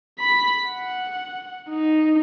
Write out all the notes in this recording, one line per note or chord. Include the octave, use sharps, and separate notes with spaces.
B5 B6
F#5
D#4